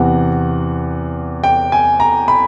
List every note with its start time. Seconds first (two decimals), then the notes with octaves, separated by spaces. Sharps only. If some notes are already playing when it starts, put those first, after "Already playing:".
Already playing: E2 C3 E3 F#5
1.44 G5
1.72 G#5
2.00 A#5
2.28 B5